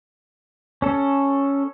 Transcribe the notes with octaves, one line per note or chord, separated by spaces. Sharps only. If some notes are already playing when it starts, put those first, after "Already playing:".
C#4 A4